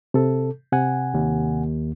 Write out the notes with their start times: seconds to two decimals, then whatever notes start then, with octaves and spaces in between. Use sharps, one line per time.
0.14 C3 A4
0.73 C3 F#5 G#5
1.14 D#2